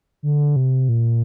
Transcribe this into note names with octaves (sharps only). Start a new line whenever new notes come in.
D3
C3
A#2